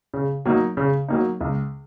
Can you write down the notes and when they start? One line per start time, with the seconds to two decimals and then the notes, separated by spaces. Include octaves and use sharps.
0.14 C#3
0.45 F#3 A#3 D#4
0.77 C#3
1.08 F#3 A#3 D#4
1.41 C#2